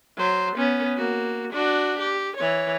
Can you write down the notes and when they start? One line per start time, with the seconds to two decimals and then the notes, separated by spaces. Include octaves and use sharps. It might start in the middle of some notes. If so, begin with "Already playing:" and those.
0.17 F#3 C5
0.56 B3 C#4
0.97 A#3 F#4
1.53 D4 F#4
1.99 G4
2.37 E3 C#5